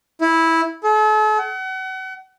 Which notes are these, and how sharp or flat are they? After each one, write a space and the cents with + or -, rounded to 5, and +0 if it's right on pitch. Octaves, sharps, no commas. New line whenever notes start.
E4 -10
A4 -45
F#5 +35